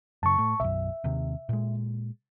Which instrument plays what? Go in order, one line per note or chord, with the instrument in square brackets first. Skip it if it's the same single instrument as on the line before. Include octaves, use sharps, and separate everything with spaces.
[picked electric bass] F#2 C#3 [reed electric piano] A5 C#6
[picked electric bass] A2
[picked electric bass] B1 F#2 [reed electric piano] E5
[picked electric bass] D#2 C3
A#2 G#3